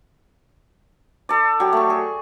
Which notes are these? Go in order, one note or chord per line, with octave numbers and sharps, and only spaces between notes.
A4 D5
F#3 G4
A3 C#6
G#4